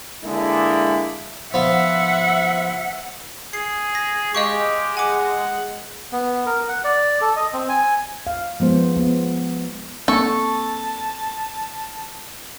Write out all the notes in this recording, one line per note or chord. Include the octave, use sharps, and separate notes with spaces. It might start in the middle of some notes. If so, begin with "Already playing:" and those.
D3 G#3 A#3 E4
F3 B3 E5 F#5
G#4 C7
A#6
G#3 G4 D#5 F5 C#6
F#5 G#5 D6
B3
A#4
F#5
D5
A4
D#5
C4
G#5
F5
F3 G#3 B3 C5
B3
A#3 C4 A4 A5 C#6